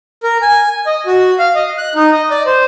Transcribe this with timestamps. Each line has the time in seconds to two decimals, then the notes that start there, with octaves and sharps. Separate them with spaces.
0.23 A#4
0.42 G#5
0.86 D#5
1.06 F#4
1.39 F5
1.55 D#5
1.78 F#6
1.95 D#4
2.12 D#5
2.30 D5
2.46 C5